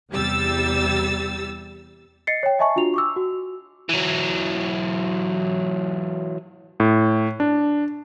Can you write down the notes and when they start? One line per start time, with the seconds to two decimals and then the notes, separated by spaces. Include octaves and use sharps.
0.11 E2 C3 G3 G4 E6 A6
2.27 D#5 A6 C7 C#7
2.43 C#5 G5
2.59 D#5 E5 G#5 A5 C#6
2.76 D4 F4 F#4 F7
2.94 C#6 D6 E6
3.16 F#4
3.89 E3 F#3
6.80 A2
7.40 D4